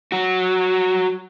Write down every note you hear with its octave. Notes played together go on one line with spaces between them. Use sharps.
F#3 F#4